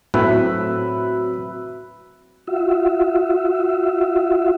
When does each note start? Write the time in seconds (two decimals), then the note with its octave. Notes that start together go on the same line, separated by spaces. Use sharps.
0.14 A2 F#3 C4 B4 E5
2.47 F4 F#4 E5